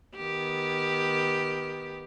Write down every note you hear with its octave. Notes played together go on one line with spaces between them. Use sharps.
D#3 B3 G4